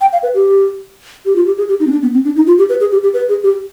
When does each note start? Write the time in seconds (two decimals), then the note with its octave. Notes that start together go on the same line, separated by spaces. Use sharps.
0.01 G5
0.13 F5
0.23 B4
0.35 G4
1.26 G4
1.36 F4
1.46 G4
1.58 G#4
1.69 G4
1.80 D#4
1.87 C4
1.91 D4
2.02 B3
2.14 C4
2.25 D4
2.36 D#4
2.47 F4
2.58 G4
2.69 B4
2.80 G#4
2.92 G4
3.03 G4
3.14 B4
3.29 G#4
3.44 G4